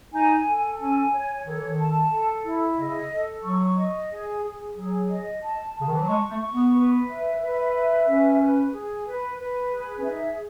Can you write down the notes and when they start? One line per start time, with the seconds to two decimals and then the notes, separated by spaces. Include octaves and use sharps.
0.13 D#4 G#5
0.46 A4
0.79 C#4 G#5
1.12 C#5
1.45 D#3 A4
1.56 E3
1.68 D#3
1.79 A5
2.11 A4
2.44 E4
2.77 C#3 D#5
3.11 A4
3.43 F#3 C#6
3.76 D#5
4.10 G#4
4.43 G#4
4.76 F#3 G#4
5.08 D#5
5.42 A5
5.74 A5
5.80 C#3
5.86 D#3
5.94 E3
6.01 F#3
6.07 G#3 C#6
6.30 A3
6.41 C#6
6.52 B3
6.74 B4
7.07 E5
7.41 B4
7.74 E5
8.06 C#4 B4
8.40 B4
8.73 G#4
9.06 B4
9.38 B4
9.71 G#4
9.98 C#4
10.04 D#4 E5